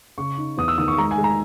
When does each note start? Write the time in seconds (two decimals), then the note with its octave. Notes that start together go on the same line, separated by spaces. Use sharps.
0.18 C#3 C#6
0.38 D#4
0.57 E2 D#6
0.68 E6
0.78 D#3 D#6
0.88 C#6
0.97 G#3 A#5
1.11 G#5
1.18 G#3
1.24 A#5